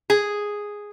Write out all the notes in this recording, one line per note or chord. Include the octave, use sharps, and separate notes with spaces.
G#4